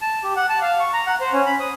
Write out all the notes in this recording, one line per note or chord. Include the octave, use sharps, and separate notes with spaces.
A5
G4
F#5
A5
F5
C#6
A#5
F#5
C5
C#4
B5
D#6